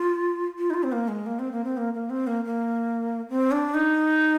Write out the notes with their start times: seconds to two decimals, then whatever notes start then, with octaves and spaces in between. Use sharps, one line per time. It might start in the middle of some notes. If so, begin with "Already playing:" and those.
Already playing: F4
0.58 F4
0.70 D#4
0.74 F4
0.83 C4
0.92 A#3
1.08 G#3
1.26 A#3
1.39 C4
1.52 A#3
1.64 C4
1.77 A#3
1.94 A#3
2.10 C4
2.27 A#3
2.45 A#3
3.30 C4
3.51 D4
3.74 D#4